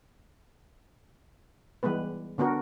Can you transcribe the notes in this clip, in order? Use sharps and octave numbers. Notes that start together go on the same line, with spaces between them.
E3 G3 G#3 B3 B4
D3 B3 D4 F#4 A#4